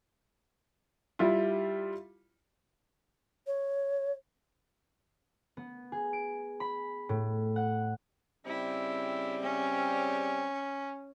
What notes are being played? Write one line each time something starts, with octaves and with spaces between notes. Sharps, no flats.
G3 E4 F4
C#5
B3
G#4
D7
B5
A2
F#5
C#3 G3 C4 E4
C#4